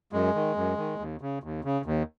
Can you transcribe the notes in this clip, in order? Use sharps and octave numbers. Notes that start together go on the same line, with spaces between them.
F#2 G#3
D#3
F#2
D#3
D#2
C#3
D#2
C#3
D#2